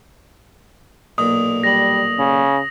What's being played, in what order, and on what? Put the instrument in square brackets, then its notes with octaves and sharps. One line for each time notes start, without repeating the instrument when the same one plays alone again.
[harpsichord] B1 A#2 [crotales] D#6
[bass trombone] G3 [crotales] A#6 F#7
[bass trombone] C#3